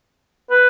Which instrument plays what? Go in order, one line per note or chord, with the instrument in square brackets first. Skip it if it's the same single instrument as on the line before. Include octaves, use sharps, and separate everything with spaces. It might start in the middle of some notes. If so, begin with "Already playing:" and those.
[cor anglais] B4